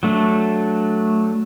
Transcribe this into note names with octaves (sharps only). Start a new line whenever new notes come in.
F#3 A3 D4